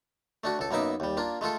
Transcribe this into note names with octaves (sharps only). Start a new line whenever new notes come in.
A3 D4 F#4
C#2 A4
F#2 A#3 B3 D#4 E5 D6
D#2 G3
A#3 D4 F4
G#3 A3 F4 A4